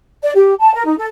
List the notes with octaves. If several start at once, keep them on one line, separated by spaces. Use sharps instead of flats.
D5
G4
A5
A#4
D#4
A4